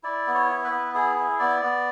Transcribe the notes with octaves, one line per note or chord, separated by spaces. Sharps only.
E4 D5
B3
C#5
E4
B4
B3
E4 G#4
E4
B3 D5
B3